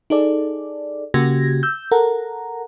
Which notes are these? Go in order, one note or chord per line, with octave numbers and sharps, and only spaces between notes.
D#4 G#4 A4 D5
C#3 A#3 F#4 G4 G#6 A#6
E6 G6
A4 A#4 F#5 A#5